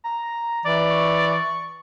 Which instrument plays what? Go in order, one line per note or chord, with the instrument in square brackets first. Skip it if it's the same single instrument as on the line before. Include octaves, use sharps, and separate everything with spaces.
[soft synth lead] A#5
[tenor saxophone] E3 [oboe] D5
[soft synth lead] C#6